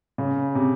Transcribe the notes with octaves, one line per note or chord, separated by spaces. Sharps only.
C#3
C3